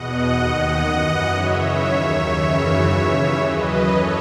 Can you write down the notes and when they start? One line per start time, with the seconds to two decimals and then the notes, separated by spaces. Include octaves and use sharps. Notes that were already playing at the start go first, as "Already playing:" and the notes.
Already playing: E2 B2 D#5 F#5
0.25 D#2 D#3
0.77 F#2 E3 D#5 F#5
1.29 F#2 C#3 E3 C#5 E5
1.81 D#2 D#3
2.34 F#2 C#3 E3
2.86 D#2 C#3 E3
3.38 F#2 E3 B4 D#5
3.90 A4 C#5